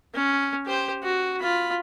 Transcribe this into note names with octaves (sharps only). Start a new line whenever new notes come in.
C#4
G4 C5
F#4
F4 B5